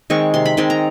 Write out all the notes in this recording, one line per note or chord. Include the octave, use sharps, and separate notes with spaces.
D#3 G#3 C4 C#6
C3 C6
B5
D#3 G#3 C4 C6
A#5